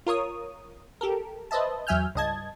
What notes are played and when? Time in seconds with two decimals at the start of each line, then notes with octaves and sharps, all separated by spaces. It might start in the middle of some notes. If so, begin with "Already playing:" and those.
0.07 F4 A#4 C#5 D#6
1.01 G4 A4 A#4
1.51 B4 C5 D#5 E5 A5
1.87 E2 F#3 E5 G#5 F6 G6
2.15 C#2 G2 D#5 A5 G#6